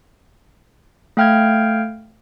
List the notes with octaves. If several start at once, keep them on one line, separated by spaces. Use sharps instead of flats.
A3 F5 G5 F6 G6 G#6